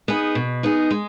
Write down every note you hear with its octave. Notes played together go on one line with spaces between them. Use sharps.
B3 D#4 G#4
B2
B3 D#4 G#4
G#3